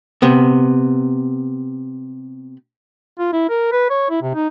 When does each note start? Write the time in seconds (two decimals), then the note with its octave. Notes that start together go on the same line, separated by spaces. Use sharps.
0.22 C3 B3
3.19 F4
3.33 E4
3.49 A#4
3.72 B4
3.90 C#5
4.10 E4
4.22 C3
4.35 D#4